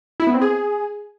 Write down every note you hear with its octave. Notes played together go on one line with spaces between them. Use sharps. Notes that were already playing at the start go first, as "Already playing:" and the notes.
E4
B3
C4
G#4